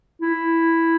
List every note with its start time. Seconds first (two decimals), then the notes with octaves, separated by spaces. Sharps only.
0.21 E4